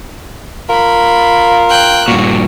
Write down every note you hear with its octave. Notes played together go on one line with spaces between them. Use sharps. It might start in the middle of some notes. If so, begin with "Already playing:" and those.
F4 A#4 B5
G5 F#6
G2 A#2 F#4